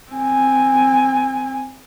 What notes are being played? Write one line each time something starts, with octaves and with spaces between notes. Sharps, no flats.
C4 G#5